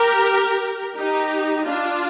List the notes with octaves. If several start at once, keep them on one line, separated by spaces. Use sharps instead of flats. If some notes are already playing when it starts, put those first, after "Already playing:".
Already playing: G4 A#4
D#4 G4
D4 F4